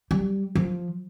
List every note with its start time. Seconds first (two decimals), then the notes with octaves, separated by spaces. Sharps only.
0.11 G3
0.55 F3